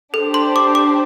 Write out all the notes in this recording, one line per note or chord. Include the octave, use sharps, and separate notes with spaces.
D4 G4 A4 C5
C6
D6
D6